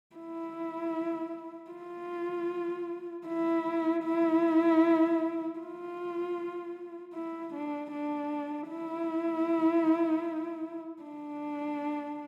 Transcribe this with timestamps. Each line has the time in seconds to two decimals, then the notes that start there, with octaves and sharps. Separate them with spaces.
0.16 E4
1.71 F4
3.26 E4
4.04 E4
5.60 F4
7.14 E4
7.53 D4
7.91 D4
8.70 E4
11.02 D4